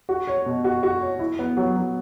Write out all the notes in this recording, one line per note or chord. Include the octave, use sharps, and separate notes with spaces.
F#4
C#5
B2
F#4
F#4
C#5
E4
B3
F#3
F#3